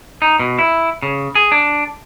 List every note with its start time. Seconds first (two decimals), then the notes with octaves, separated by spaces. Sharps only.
0.22 D#4
0.39 B2
0.59 E4
1.03 C#3
1.35 G#4
1.52 D4